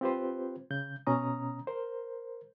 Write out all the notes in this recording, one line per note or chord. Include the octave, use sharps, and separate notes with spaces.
C4 F4 G4 B4 C5
C#3 G6
B2 C#4 A#5 D#6
A#4 C5